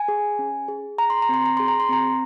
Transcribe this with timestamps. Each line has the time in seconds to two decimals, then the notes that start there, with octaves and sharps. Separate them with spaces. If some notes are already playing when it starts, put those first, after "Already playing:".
Already playing: G#5
0.08 G#4
0.39 C#4
0.68 G#4
0.98 G#4 A#5
1.10 C6
1.22 A#5
1.29 C4 C6
1.46 A#5
1.57 G#4 C6
1.68 A#5
1.80 C6
1.89 C4 A#5